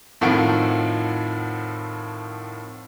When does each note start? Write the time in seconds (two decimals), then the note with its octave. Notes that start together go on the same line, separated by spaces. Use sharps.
0.21 F2 A2 D#3 F3 F#5 D7